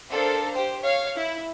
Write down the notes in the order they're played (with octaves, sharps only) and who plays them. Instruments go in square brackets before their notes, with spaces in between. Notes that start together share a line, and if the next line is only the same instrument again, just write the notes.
[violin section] D4 A4 A#4 C5 F5
G4 C5
C#5 F5
E4